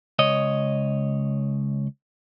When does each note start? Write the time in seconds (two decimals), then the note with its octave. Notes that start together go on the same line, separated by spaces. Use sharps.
0.19 C#2 C#5 D#5